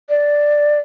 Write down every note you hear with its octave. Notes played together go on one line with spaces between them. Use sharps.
D5